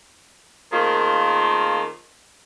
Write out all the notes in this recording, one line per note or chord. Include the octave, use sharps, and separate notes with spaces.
D#3 A3 A#3 C4 F4 G#4